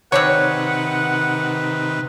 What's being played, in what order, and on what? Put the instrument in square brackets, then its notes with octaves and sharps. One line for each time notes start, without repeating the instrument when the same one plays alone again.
[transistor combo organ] C3 D#3 [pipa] C4 D4 C#5 [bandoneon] B4 [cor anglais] F#5